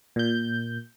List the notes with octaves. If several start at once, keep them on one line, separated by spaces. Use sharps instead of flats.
A#2 G6